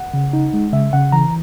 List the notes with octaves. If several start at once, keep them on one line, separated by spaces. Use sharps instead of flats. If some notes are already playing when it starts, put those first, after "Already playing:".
Already playing: F#5
C#3
D#4
G#3
C#3 E5
C#3 F#5
E3 A#5